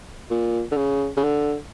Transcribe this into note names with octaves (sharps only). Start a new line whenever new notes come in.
A#2
D3
C#3
C#3
D3